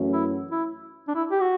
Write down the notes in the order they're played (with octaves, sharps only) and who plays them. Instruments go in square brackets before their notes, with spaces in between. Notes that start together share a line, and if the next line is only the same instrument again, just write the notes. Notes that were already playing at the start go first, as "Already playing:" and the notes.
Already playing: [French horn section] F#2 E3 A3 C#4 F#4
[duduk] E4
E4
D4
E4
G4
F#4